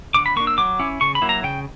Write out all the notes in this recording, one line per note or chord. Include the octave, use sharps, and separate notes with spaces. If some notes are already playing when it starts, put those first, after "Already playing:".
D3 D6
B5
A#3 D4 C#6
E6
F#3 D6
C#4 E4
C#3 C#6
B5
F#3 A#3 E4
A#5
C#3 G5